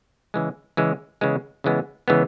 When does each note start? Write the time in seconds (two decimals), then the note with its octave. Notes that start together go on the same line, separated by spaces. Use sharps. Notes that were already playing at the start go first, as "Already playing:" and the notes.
0.34 C#3 E3 G#3
0.77 C#3 E3 G#3
1.21 C#3 E3 G#3 B3
1.64 C#3 E3 G#3 B3
2.08 C#3 E3 G#3 B3